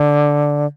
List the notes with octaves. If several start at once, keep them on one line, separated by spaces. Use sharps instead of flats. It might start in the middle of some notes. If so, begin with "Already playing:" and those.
Already playing: D3